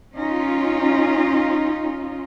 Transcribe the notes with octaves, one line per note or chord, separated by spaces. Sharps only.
C#4 D#4 F4